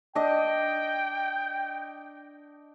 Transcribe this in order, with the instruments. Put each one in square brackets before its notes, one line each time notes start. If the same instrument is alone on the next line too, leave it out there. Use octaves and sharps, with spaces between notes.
[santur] D4 D#5 [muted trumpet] G5